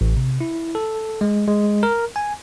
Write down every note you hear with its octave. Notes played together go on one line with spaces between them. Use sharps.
A1
C3
E4
A4
G#3
G#3
A#4
G#5